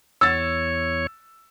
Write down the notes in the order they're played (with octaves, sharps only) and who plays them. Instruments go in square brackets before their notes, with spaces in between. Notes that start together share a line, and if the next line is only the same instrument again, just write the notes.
[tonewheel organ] E2 C#5 [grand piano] E6 A6